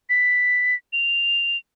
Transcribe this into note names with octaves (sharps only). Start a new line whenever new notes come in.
B6
F7